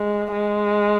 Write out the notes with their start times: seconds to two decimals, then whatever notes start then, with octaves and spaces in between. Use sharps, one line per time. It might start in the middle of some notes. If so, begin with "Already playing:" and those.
Already playing: G#3
0.33 G#3